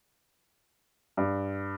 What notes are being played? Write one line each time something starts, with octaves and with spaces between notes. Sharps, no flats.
G2